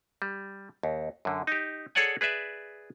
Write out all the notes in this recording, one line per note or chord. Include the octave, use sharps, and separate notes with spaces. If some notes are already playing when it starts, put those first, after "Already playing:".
G3
D#2
F#2 D3
D#4 G4
G#4 A4 C#5 D5 F#5 G#5
G#4 B4 D5 E5